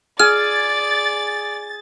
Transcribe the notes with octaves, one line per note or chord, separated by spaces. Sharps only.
G#4 D5 F6 A6